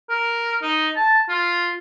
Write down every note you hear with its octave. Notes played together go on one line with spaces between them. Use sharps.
A#4
D#4
A5
F4